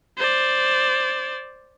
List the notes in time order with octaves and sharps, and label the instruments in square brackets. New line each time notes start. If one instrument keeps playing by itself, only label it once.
[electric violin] C5 D5